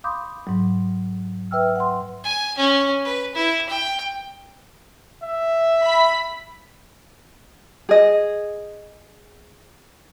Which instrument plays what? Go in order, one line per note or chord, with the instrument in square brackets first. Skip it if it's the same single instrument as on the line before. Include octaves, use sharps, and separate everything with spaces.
[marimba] F5 B5 C6 D6 D#6 G6
G#2 F#3
B4 E5 G5 E6 F6
F#5 C6
[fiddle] G#5
C#4
B4
E4
G5
[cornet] E5
[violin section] B5 B6
[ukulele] G#4 D#5